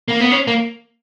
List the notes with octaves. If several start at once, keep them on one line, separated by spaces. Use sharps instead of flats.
A#3
B3
C#4
A#3